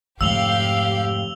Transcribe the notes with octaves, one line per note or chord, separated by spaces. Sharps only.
F1 G#2 D3 G4 F5 E6 F7 G7